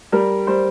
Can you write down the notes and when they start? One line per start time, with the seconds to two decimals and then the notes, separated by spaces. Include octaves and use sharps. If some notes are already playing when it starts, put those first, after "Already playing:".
0.12 G3 A#4
0.47 G3 C5